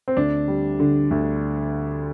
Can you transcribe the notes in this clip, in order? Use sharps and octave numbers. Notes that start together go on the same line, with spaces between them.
C4
D2 D4
G3
D3
D2